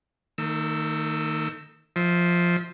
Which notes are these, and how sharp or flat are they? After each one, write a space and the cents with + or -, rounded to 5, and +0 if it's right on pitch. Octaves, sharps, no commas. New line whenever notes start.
D#3 +0 A3 +45 E6 +0
F3 +0 E5 -30